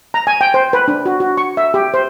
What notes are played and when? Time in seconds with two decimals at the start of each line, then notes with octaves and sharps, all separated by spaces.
0.14 A#5
0.27 G#5
0.41 G5
0.54 C5
0.73 B4
0.88 D4
1.06 F#4
1.20 F#4
1.37 C#6
1.57 E5
1.74 G4
1.94 C5